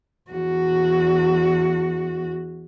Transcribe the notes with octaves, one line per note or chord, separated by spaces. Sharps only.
E2 F#4